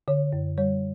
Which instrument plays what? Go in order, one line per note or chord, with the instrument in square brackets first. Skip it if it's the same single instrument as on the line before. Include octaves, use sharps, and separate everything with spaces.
[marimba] D3 C#5
F#2
G3 C#5